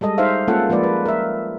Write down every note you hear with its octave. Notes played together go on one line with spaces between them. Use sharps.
G3 G#3 A4 D#5
D#4 C5 E5 F5
G#3 A#3 C#4 F4 A4 F#5
F3 G#3 A#3 B4 D5
B4
A#4 E5